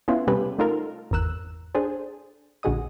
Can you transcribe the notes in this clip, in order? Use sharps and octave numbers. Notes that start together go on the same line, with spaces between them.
B3 C#4 E4 F4 B4
C3 G3 C#4 G4 A4 B4
A3 D#4 F4 A4 A#4
G#1 E2 A#4 E6 F#6
D4 G#4 A4 C5
A#1 D3 F#4 G#4 D#5 D#6